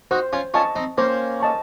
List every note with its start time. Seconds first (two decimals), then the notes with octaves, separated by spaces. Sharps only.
0.11 D#4 F#4 C5
0.33 C#4 F4
0.54 C#4 F4 D#5 A5 C#6
0.76 C4 D#4
0.98 A#3 C#4 C5
1.40 D#5 A5 C#6